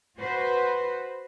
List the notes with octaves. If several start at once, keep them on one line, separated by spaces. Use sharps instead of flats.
F#4 B4 C5